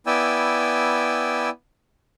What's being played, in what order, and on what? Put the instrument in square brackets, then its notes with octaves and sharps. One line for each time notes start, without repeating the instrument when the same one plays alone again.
[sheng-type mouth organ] B3 E4 D5 G5 G#5 E6